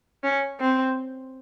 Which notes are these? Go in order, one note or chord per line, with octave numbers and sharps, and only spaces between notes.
C#4
C4